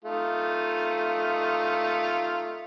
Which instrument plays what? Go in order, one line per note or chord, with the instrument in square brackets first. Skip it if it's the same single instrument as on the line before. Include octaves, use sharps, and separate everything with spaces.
[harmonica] A3 D#4 F4